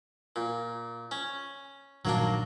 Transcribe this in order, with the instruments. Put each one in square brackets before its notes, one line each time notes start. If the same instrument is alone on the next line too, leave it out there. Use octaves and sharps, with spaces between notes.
[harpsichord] A#2
C#4
[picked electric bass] A#1 G2 D#3 [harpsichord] F#3 A#3 D4